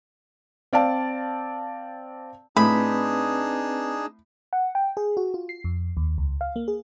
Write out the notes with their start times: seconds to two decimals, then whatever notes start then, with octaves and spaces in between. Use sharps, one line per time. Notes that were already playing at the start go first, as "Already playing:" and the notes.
0.73 C4 D5 F5 A5
2.57 A2 C4 D4 D#4 G#4 B4 B5
4.53 F#5
4.75 G5
4.97 G#4
5.17 F#4
5.34 F4
5.49 C7
5.64 F2
5.97 D#2
6.18 C#2
6.41 F5
6.56 A#3
6.68 G#4